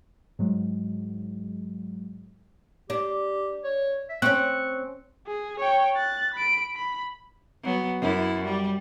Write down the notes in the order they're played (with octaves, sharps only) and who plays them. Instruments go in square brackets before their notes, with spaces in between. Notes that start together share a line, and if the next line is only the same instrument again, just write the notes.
[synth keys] G#2 F#3 G#3
[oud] D4 [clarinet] G4
[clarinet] C#5
E5
[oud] C4 C#4 [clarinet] C#6 [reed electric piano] F#6
[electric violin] G#4
C#5 G5
F#6 A6
B5 D7
B5
[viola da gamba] F#3 B3
F#2 E4
G3